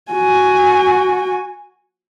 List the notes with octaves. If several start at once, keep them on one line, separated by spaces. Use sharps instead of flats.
F#4 G#5